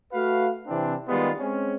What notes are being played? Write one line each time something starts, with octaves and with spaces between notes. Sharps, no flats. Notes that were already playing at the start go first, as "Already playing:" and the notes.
A3 F#4 B4 F5
C3 E3 C4 D4
D#3 G3 G#3 B3 F4
G#3 C4 C#4